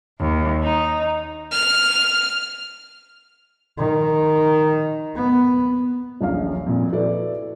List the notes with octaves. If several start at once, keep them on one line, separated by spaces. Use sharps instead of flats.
D#2
D#4
F6
D#3
B3
D#1 A#1 F#2 F5
F2 A#2
E4 F#4 A4 B4 D5